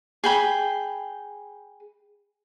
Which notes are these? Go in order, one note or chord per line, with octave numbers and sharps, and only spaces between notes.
G#4 G5 B5